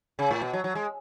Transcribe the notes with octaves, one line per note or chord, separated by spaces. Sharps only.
C#3
A2
B2
F#3
F#3
G#3